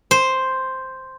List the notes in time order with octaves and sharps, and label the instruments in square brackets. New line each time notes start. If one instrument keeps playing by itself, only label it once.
[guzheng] C5